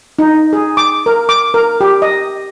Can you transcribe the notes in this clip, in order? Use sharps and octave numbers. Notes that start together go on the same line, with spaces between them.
D#4
G#4
D6
A#4
D6
A#4
G4
D#5